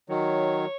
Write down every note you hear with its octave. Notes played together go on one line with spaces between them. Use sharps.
D#3 F#3 C#5